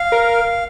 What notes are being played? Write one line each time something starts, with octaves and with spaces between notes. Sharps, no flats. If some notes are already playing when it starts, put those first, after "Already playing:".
Already playing: F5
A#4